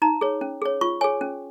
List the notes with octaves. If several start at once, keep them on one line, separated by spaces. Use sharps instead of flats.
D#4 A#5
G#4 C#5
C#4
G#4 C#5
F4 C#6
G#4 C#5 G#5
C#4